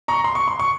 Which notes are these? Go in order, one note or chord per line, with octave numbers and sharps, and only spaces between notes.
A#5 C#6
C6
C#6
C6
C#6